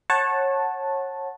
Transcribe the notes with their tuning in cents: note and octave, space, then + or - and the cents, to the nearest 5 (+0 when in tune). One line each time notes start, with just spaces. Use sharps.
C#5 -25 F#5 +0 A5 +0